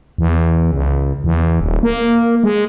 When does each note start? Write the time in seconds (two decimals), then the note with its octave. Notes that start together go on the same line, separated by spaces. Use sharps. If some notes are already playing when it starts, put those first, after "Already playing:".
0.18 E2
0.72 C#2
1.24 E2
1.61 D#1
1.83 A#3
2.44 G#3